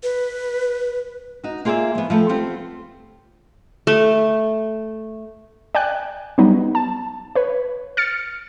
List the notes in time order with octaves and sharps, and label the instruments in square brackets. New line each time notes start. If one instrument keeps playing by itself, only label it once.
[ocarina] B4
[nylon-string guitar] D#4 F#4
A#3 F4 G#4 C#5 D5 E5
F3 B3
F3 A3 A4 B4 G5
B3 C4 F4 G4
[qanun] A3
[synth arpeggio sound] D5 G5 G#5 F#6
F#3 G3 B3 D#4
A5
B4 C#5
F6 A6 C#7